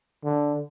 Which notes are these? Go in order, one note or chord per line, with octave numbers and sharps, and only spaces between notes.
D3